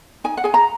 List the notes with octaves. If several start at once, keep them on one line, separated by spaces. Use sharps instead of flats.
D#4 G#5
F#5
G#4 G#5
A#5